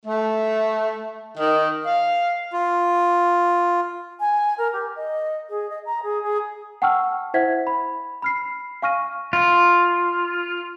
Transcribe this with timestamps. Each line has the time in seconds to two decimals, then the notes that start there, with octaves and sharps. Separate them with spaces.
0.06 A3
1.38 D#3
1.84 F5
2.52 F4
4.20 G#5
4.58 A#4
4.73 G4
4.96 D#5
5.49 G#4
5.69 D#5
5.85 A#5
6.03 G#4
6.23 G#4
6.82 F#5 G5 A5 C#6 E6 F6
7.34 E4 C5 E5 F#5 G#6 B6
7.67 B5
8.22 B5 F6 C7
8.82 F5 G#5 C#6 F6 A#6 D#7
9.33 F4